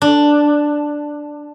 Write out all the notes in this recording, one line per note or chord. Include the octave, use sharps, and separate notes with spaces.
D4